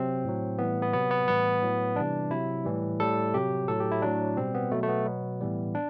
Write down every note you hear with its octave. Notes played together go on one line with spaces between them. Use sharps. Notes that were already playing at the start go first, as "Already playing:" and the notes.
Already playing: C3 F#3 C4
A2 F#3
A2 E3 G3 B3
B3
C3 F#3 B3
B3
A2 E3 G3 B3
A2 F#3
C3 E3 G3 D4
C3 F#3 E4
A2 E3 G3
A2 G3 A4
C3 F#3 G4
A2 F#3 A4
G4
E4
A2 F#3 D4
B2 G3 C4
B3
B2 F#3 A3
A3
B3
B2 F#3
A2 E3 G3
D4